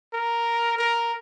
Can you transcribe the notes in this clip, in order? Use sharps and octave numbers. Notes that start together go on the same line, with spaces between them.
A#4
A#4